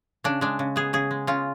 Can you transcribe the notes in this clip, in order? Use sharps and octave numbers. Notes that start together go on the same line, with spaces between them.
C#3 D4
G#3 D4
C#3
B3 G#4
C#3 G#4
G#3
C#3 F4